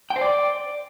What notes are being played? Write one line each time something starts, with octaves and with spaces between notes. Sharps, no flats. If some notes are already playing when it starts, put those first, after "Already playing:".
G5
C5
D5